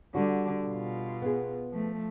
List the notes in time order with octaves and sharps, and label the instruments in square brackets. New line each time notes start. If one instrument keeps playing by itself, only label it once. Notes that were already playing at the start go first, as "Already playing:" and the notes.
[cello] D3 [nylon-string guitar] G3 F#4
[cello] B2 F4
[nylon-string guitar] B3 G#4
[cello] F3 A3